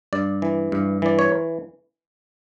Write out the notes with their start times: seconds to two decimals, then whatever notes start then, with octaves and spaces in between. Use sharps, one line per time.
0.13 G2 D5
0.42 E3
0.72 G2
1.02 E3 D5
1.19 C#5